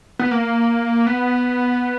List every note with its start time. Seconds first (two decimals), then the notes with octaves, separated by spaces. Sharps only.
0.19 B3
0.31 A#3
1.07 B3